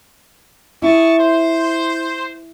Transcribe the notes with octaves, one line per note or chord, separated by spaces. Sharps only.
E4 G#4 A5 C#6
C5